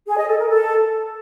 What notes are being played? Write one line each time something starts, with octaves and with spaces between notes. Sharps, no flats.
G#4
D#5
A4
A#4
A4